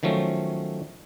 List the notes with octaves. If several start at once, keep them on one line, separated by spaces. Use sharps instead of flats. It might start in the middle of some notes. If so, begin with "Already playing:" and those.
D#3 F3 F#3 A3 C#4